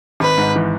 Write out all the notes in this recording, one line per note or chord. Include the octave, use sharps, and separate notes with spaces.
G#1 B4
G#2
E3